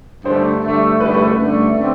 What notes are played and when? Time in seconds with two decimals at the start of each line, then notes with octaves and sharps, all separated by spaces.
0.25 G2 D3 A3 C5
0.63 G2 D3 A3
1.00 G2 D3 A3 B4
1.14 B4
1.26 B4
1.39 G2 D3 A3
1.76 D3 A3 C4